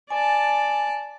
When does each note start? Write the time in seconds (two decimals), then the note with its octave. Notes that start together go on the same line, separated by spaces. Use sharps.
0.10 D5 G#5 A5